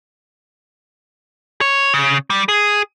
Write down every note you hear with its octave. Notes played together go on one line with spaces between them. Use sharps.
C#5
C#3
G3
G#4